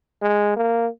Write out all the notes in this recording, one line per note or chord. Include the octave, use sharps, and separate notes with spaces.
G#3
A#3